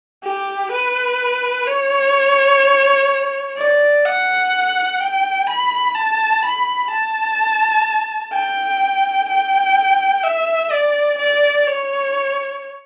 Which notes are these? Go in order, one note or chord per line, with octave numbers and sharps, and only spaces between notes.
G4
B4
C#5
D5
F#5
G5
B5
A5
B5
A5
G5
G5
E5
D5
D5
C#5